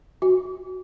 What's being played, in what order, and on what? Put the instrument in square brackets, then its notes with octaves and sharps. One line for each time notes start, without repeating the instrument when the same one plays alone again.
[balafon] F#4